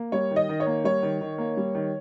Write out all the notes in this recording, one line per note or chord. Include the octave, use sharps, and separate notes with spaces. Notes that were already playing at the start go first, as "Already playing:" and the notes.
Already playing: A#3
G3 C#5
D#3
D#5
D#3
C#5
A#3
G3 C#5
D#3
D#3
A#3
G3
D#3